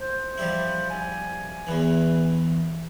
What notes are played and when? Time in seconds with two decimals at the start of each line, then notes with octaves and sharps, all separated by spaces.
0.01 C5
0.38 F3 G3 E4
0.90 G#5
1.67 E2 E3 B4